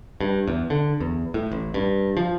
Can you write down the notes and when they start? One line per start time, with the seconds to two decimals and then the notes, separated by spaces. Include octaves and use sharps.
0.21 G2
0.48 E2
0.70 D3
1.00 E2
1.34 A2
1.52 A1
1.74 G2
2.17 F3